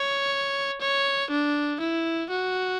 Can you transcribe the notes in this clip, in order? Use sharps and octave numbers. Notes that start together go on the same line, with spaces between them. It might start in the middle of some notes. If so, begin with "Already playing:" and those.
Already playing: C#5
C#5
D4
E4
F#4